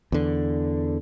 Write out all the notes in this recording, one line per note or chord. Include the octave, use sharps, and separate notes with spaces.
E2 D3